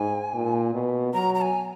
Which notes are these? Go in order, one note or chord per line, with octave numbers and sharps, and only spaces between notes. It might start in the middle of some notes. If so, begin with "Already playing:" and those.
Already playing: G#2 G#5
A#2
B2
F#3 A#5
A#5
G#5